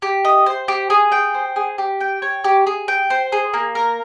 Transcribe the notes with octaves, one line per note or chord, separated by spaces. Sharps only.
G4
D#5
C5
G4
G#4
G5
C5
G#4
G4
G5
C#5
G4
G#4
G5
C5
G#4
A#3
A#4